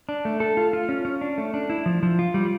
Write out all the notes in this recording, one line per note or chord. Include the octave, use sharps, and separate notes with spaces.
D4
A3
A4
F4
F4
C#4
C#4
D4
A3
D4
E4
F3
F3
F4
G3